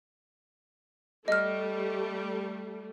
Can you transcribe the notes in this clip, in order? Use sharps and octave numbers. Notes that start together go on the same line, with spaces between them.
G3 A3 D#5 F6